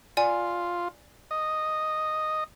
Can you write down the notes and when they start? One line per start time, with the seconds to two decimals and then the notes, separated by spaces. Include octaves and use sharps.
0.17 F4 D5 G#5
1.31 D#5